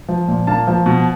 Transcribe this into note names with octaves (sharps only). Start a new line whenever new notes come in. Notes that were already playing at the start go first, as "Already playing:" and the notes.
F3
A#2
A#3 A5
F3
B2